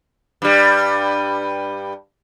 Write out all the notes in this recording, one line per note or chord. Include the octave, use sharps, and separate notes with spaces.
G2 G3